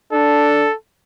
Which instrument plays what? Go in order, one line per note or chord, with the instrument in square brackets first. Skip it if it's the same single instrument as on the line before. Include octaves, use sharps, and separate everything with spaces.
[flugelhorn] D4 [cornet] A4